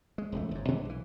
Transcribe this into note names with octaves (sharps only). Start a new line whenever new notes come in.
G#3
E1 C#2 A3
G1 G#2
B2 G#3 A3 D4
B1 E3